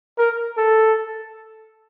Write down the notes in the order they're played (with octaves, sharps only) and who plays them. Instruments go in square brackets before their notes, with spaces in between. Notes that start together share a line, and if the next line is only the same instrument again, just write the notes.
[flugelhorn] A#4
A4